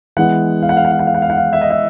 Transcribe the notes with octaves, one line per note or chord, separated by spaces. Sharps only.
E3 G#3 B3 F#5
F5
F#5
F5
F#5
F5
F#5
F5
F#5
F5
F#5
F5
E5
D#5
E5